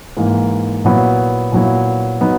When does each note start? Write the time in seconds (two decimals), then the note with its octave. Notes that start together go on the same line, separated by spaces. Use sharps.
0.17 G#2 E3 A#3
0.84 A#2 F#3 B3 E4
1.52 A#2 F#3 B3 E4
2.21 F#3 B3 D#4